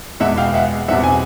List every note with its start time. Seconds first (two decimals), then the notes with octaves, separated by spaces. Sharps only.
0.20 E2 B2 G#3 B3 E5 F#5
0.37 F5 G5
0.54 E5 F#5
0.88 E2 B2 G3 C4 E5 F#5
1.04 G#5